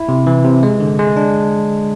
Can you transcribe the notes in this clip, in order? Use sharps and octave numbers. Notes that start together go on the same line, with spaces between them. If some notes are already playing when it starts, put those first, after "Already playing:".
Already playing: E4
C3
E3
C3
G#3
D3
G#3
D4